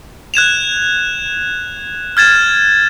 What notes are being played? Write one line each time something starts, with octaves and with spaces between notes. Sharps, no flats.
F#6 G#6 E7 F7
F6 G#6 A6 E7